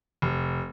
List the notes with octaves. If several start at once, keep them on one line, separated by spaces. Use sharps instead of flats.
F1